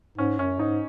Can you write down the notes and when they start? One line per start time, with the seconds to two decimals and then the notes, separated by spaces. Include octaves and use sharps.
0.18 G#2 C#4
0.39 F#2 C#4
0.59 G#2 D#4